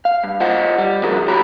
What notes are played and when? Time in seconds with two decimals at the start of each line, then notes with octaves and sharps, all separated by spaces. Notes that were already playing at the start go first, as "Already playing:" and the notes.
0.05 F5
0.24 G2
0.40 F4 C5 D#5 F#5
0.78 G3
1.03 C#3 F3 F#4 G#4 A#4
1.27 C#2 F#4 G4 C#5 A#5 B5